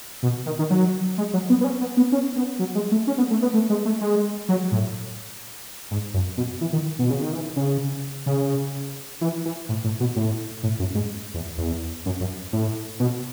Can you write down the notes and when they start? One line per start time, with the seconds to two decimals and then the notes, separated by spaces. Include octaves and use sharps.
0.23 B2
0.46 D#3
0.59 D#3
0.70 F#3
1.18 G#3
1.33 F#3
1.50 B3
1.61 B3
1.64 C#4
1.81 B3
1.97 B3
2.12 C#4
2.36 B3
2.59 F#3
2.75 G#3
2.91 A3
3.07 C#4
3.18 B3
3.31 A3
3.42 B3
3.54 A3
3.70 G#3
3.85 A3
4.01 G#3
4.49 F#3
4.72 A2
5.91 G#2
6.14 F#2
6.37 B2
6.61 E3
6.73 D#3
6.99 B2
7.10 C#3
7.21 D#3
7.32 E3
7.56 C#3
8.26 C#3
9.21 E3
9.45 E3
9.69 A2
9.84 A2
10.00 B2
10.16 A2
10.63 A2
10.79 F#2
10.95 G#2
11.34 E2
11.58 E2
12.06 F#2
12.20 F#2
12.53 A2
13.00 B2